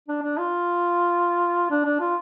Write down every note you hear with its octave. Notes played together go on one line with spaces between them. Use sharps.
D4
D4
F4
D4
D4
F4